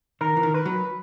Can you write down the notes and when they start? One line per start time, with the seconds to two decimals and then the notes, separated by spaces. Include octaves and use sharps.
0.21 D#3 A#4
0.37 E3
0.43 D#3
0.54 B4
0.66 F#3